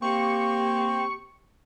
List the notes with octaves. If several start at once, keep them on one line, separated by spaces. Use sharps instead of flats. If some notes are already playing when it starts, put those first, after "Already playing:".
A#3 C4 G4 C#6